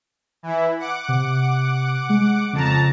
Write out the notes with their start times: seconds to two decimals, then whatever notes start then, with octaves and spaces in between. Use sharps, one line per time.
0.43 E3 E4
0.79 F#5 D6
1.08 C3
2.09 G#3
2.53 F2 C#3 A5 A#5